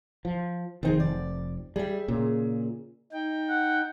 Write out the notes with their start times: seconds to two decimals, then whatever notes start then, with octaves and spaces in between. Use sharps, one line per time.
0.25 F3
0.83 F1 D#3 C4 D#4 G#4
1.00 D5
1.76 G3 G#4 E5
2.08 A#2 C#3
3.13 D#4 G5
3.49 F#5